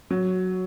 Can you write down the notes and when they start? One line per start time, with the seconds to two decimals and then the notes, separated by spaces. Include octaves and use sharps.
0.11 F#3